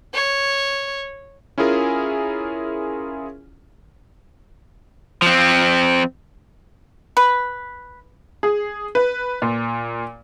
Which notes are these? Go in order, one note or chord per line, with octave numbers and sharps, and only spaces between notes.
C#5
C#4 E4 F4 G#4 A#4 G#5
F3 C4
B4
G#4
B4
A#2